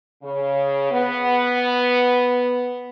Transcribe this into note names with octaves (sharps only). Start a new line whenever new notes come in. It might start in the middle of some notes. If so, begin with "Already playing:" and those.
C#3
B3